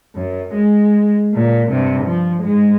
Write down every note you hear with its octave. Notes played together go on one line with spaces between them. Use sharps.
F#2
G#3
A#2
G2 C3
F3
G#2 G#3